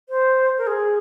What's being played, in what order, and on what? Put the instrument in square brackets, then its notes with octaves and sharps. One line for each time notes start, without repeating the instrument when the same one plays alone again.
[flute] C5
A#4
G#4